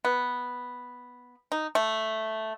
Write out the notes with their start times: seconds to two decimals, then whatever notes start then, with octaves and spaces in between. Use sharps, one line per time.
0.05 B3
1.52 D#4
1.75 A3